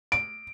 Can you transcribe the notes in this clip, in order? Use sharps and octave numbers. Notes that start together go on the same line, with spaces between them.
D7